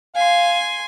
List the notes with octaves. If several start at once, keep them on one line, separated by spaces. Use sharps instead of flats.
F5 G#5 C6